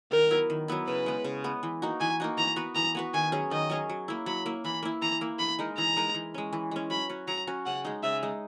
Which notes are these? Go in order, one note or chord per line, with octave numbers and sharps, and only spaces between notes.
D#3 A#4
F#3 B3 E4
D#3
F#3 B3 E4
C#3 B4
G#3 B3
C#3
G#3 B3
E3
A#3 D#4 F#4
E3 G#5
A#3 D#4 F#4
E3 A#5
B3 F#4 B4
E3 A#5
B3 F#4 B4
D#3 G#5
F#3 C#4 G#4
D#3 D#5
F#3 C#4 G#4
F#3
A#3 E4
F#3 B5
A#3 E4
E3 B5
A#3 E4
E3 A#5
A#3 E4
E3 B5
G#3 D#4 A#4
E3 A#5
G#3 D#4 A#4
E3
G#3 C#4
E3
G#3 C#4
F#3 B5
C#4 F#4
F#3 A#5
C#4 F#4
C#3 F#5
G#3 D#4
C#3 E5
G#3 D#4